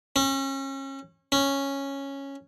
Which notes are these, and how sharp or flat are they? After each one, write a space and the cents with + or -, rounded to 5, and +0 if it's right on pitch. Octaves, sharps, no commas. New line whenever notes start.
C#4 -30
C#4 -5